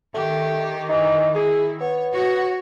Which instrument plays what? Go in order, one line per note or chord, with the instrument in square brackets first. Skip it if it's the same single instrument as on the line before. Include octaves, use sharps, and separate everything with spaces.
[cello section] D#3 [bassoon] A3 [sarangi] G4
[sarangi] E3 [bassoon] D#4
[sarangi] E4 [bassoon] G#4
[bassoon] B3 [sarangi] C#5
[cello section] F#4 [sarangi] C#5